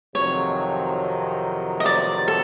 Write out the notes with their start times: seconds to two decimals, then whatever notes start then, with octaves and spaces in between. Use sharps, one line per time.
0.14 F2 C3 D#3 F#3 C#5
1.80 D#5
1.86 D5
2.28 A4